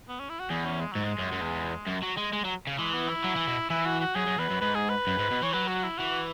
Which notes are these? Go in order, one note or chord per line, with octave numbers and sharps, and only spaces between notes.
B3
C#4
E4
F#4
E2 G#4
C#4
G#3
G#2 F#3
G#3
F#2
F#2
E2
F#2
F#3
G#3
G#3
F#3
C#3
E3 G#3
B3
E4
F#3
E3
B2
E3 E4
F#4
F#4
F#2 G#4
F#2
E2 B4
F#2
G#2 B4
G#4
B4
F#2
G#2
B2
E3 C#5
F#3 B4
F#4
E4
E3 F#4